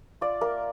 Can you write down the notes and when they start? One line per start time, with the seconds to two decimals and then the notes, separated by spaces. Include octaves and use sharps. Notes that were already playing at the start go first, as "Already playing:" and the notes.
0.21 F4 D5
0.41 A#3 A#4